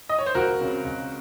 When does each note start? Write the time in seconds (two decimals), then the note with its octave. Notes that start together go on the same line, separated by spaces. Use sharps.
0.09 D#5
0.19 C#5
0.26 C5
0.35 C#2 F#4 A#4
0.60 C#3 F#3 C4
0.84 C#2